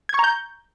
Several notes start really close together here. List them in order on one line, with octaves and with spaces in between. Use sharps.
G#6 C#6 A#5 G6